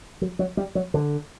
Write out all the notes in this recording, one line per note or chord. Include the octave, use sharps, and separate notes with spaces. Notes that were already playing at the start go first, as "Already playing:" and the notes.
F#3
F#3
G3
F#3
D3